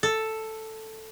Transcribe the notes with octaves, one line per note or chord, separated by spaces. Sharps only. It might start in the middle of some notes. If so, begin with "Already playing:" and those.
A4